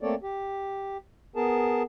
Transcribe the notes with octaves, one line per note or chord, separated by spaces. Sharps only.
A3 A#3 C4 A4 C#5 D5
G4
B3 G#4 A#4 A5